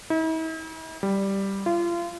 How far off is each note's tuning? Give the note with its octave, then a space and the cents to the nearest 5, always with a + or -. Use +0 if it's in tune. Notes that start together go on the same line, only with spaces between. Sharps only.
E4 -45
G3 +0
F4 -30